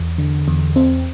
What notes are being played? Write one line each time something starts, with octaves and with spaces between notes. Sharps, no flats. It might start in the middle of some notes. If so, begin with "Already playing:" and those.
Already playing: E2
D3
E2
C4